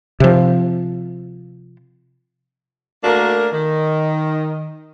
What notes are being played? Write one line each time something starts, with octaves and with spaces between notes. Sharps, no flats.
C3 F3
A3 A#3 D4 F#4 A#4
D#3